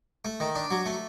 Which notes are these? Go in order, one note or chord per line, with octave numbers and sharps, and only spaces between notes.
A3
D#3
D4
F#3
A3